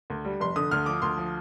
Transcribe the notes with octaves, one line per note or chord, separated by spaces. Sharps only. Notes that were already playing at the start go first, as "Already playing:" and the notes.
D2
G3
F1 C6
D3 D#6
D2 F6
F3 D6
D2 C6
F3